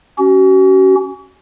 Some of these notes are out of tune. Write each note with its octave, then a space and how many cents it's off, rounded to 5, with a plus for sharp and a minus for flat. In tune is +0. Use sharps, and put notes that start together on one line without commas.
C#4 +0 F#4 +40